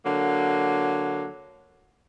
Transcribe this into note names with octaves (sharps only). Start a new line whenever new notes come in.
D3 F#3 A#3